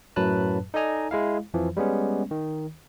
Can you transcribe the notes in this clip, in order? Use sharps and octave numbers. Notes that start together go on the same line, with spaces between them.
F#2 A2 F#3 B4 A5 F#6
D#4 A4 D5 D#5 G#5 A#5
G#3 E4 F5
F2 E3 F3
G3 G#3 B3 C#4
D#3